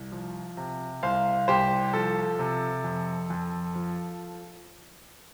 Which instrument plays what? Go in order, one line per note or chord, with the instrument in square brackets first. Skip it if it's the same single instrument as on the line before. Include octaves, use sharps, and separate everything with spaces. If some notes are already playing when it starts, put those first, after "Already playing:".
Already playing: [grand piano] C2
F3
C3
C2 C5 F5
C2 G4 C5
F3 A4
C3
F2
F2
F3